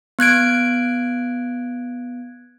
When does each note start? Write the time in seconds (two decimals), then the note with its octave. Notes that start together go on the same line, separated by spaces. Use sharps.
0.19 B3 F#6 G#6 D7